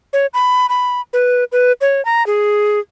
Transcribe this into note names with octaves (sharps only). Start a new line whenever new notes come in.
C#5
B5
B5
B4
B4
C#5
A#5
G#4